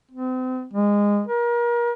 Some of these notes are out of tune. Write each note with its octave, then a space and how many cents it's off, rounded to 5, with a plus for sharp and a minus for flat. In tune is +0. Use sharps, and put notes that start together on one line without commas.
C4 -35
G#3 -20
A#4 +35